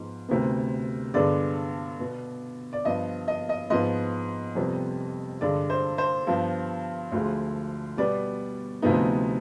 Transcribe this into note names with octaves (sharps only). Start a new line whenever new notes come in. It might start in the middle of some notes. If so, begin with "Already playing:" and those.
Already playing: G#2 F3 B3
D2 C3 D#3 B3
G2 D3 G#3 B3 D5
B2 B3
D5
G2 F3 B3 D#5
D#5
D#5
G#2 F3 B3 D#5
F2 C3 G3 B3
G2 D3 G#3 D5
C5
C5
G2 F3 B3
D2 D3 F3 G#3
B2 G3 B3 D5
D2 C3 F3 B3 D#4